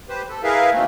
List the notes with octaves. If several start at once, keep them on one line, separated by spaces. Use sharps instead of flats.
G4 B4 C5
A4
E4 G#4 A#4 B4 E5 F5
B2 D#3 E3 A3 A#3 C4